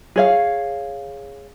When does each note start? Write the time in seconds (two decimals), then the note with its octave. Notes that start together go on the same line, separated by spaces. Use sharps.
0.16 G#4 C#5 F5